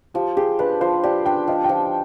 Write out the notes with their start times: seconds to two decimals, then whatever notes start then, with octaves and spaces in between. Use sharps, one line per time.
0.14 F3 G4
0.37 G4 G#4
0.59 D4 B4
0.81 F3 C5
1.04 G4 D5
1.25 D4 G5
1.47 F3 D#5
1.64 G5
1.69 F3